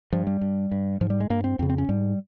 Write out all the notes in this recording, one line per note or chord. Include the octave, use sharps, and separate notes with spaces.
G2 F3
G3
G2
G2
G#2 F3
G3
G#3
G2 A#3
C4
F2 C#3 C4
C4
C#4
G#2 G3